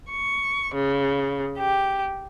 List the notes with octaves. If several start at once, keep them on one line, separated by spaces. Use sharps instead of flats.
C#6
C#3
G4